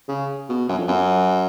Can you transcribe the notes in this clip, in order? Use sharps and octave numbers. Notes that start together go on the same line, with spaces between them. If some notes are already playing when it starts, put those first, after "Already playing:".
C#3
B2
F#2
F2
F#2